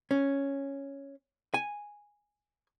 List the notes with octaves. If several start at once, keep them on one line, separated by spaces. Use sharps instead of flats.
C#4
G#5